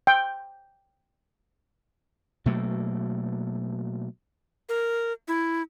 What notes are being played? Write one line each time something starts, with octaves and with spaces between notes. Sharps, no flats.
G5
B2 F#3 A3 A#3
A#4
E4